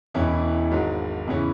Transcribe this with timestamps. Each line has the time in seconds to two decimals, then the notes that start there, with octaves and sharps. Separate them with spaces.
0.14 E1 E2 E3 C#4 E4
0.71 G#1 G#2 F#3
1.28 E2 C#3 E3 C#4